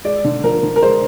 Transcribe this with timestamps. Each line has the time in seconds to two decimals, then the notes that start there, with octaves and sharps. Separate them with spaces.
0.04 G#3 D5
0.24 D3
0.44 F3 A#4
0.63 D3
0.76 A#4
0.82 G#3 C5